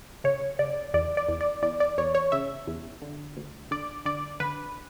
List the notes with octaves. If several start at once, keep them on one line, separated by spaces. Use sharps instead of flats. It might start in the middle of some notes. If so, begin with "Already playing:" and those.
C#3 C#5
C#3 D5
E2 D5
D5
E2
D5
E2 D5
D5
E2 C#5
C#5
C#3 E5
E2
D3
D2
D3 D5
D3 D5
D3 B4